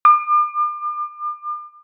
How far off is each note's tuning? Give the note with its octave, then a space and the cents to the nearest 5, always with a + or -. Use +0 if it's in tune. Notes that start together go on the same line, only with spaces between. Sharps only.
D6 +40